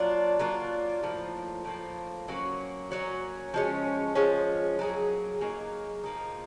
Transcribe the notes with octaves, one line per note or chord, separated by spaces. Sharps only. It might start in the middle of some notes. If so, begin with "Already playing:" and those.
Already playing: F#3 A#3 D4 F4
F#3 A#3 D4 F4
A2 F3 A#3
A2 F3 A#3
F#3 A#3 C#4 F#4
F#3 A#3 C#4 F#4
F3 G#3 C#4
F3 G#3 C#4
F#3 A#3 D#4 G#4
F#3 A#3 D#4 G#4
F3 A#3 D#4